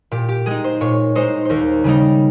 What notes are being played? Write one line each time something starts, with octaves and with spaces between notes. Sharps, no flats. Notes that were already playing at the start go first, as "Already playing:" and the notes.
A#2 G4
G4
G#3 D#4 G#4
C5
A#2 C#5
G#3 D#4 C5
D#2 A#4 C5
C#3 G3 A#3 D#4